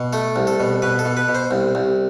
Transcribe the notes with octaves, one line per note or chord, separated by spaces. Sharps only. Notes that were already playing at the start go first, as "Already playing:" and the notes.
Already playing: B2
A3 A4
C2
A4
B2
B2 B4
A4
B2
B4
B2
C5
C2
C2